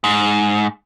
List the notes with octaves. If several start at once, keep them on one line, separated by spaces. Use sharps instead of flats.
G#2